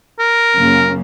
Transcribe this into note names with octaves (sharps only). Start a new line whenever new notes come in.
A#4
F#2 C#3 A#3